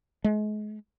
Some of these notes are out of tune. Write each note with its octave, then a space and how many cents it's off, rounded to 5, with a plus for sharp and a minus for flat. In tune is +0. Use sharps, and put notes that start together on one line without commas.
G#3 +35